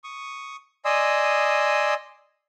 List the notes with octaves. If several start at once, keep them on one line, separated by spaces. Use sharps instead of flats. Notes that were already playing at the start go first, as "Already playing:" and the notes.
C#6 D#6
D5 D#5 G#5 C6 D#6 E6